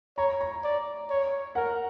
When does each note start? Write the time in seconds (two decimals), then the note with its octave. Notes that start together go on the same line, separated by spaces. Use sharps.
0.17 C#5 A#5
0.41 A#5
0.64 D5
1.09 C#5
1.55 A#4 F#5